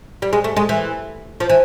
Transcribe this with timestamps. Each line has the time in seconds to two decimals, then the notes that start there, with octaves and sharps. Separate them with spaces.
0.22 G3
0.33 G#3
0.44 A3
0.57 G#3
0.69 E3
1.40 F3
1.49 E3